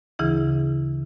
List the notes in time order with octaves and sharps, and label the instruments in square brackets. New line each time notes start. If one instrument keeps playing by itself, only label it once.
[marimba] D2 C#3 E3 E4 G#4